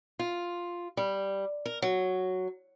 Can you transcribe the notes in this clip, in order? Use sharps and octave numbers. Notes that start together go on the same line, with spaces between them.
F4
G3
A#4
F#3